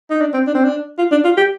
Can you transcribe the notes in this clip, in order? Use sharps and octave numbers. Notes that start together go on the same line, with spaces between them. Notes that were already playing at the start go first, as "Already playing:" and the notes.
D#4
D4
C4
D4
C4
D4
F4
D4
F4
G4